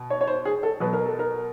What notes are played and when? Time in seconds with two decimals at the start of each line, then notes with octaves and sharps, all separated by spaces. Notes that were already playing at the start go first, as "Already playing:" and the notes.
Already playing: B2
0.10 C#5
0.21 C#5
0.27 C5
0.45 G#4
0.63 A4
0.80 B2 F#3 B4
0.93 A#4
1.06 A4
1.19 A#4